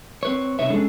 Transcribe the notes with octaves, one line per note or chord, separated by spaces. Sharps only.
C4 B4 C#5
C3 D#4 B4 C#5 E5
G#3 B3 C#4 D4 G#4 A4